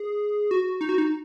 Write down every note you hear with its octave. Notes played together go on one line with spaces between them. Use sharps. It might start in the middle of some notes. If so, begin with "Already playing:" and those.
Already playing: G#4
F#4
D#4
F#4
D#4